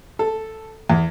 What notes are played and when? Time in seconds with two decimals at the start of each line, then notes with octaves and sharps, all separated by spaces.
0.19 A4
0.90 E2